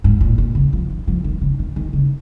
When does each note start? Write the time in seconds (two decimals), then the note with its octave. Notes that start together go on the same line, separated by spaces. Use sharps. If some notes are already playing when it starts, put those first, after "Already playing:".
0.04 G#2
0.21 A#2
0.38 A#2
0.55 C#3
0.73 F3
0.90 D#3
1.07 F3
1.24 D#3
1.41 C#3
1.59 D#3
1.76 D#3
1.93 C#3